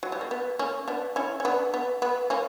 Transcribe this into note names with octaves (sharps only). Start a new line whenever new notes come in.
F#3
G3
A#3
B3
A#3 C#4
B3 D4
C#4 E4
C#4
B3 D4
B3
B3
A#3 C#4